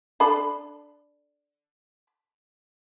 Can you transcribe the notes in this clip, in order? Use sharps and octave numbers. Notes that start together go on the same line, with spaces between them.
D4 A4 B5